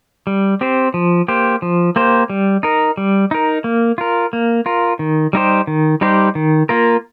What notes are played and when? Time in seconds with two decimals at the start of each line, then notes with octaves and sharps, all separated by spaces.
0.27 G3
0.61 C4 G4 C5
0.94 F3
1.28 A#3 G4 C5
1.62 F3
1.96 A#3 G4 C5
2.30 G3
2.63 D#4 A#4
2.97 G3
3.31 D#4 A#4
3.64 A#3
3.98 F4 A#4
4.33 A#3
4.66 F4 A#4
4.99 D#3
5.33 G3 D#4 G4 C5
5.67 D#3
6.01 G3 D#4 G4 C5
6.35 D#3
6.69 A#3 F4 A#4